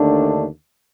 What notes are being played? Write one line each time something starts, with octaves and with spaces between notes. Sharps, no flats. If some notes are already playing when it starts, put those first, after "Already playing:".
Already playing: D#2 D3 A3 D4